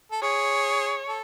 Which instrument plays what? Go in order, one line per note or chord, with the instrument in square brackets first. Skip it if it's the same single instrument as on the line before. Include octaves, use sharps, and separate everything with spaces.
[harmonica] A4
[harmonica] G#4 [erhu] C#5
[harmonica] A4